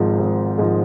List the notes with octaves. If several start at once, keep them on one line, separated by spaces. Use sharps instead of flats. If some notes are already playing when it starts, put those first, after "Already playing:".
Already playing: G#1 G#2 F3 G#3
G#1
G#2 F3 G#3